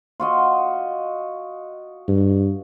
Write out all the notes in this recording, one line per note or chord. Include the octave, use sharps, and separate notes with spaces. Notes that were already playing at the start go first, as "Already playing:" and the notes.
F4 F#4 D#5
G2